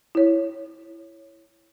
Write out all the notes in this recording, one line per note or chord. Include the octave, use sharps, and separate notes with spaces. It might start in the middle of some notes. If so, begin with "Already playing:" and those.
E4 C#5